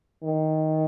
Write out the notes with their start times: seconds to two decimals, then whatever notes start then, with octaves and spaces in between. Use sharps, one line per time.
0.23 D#3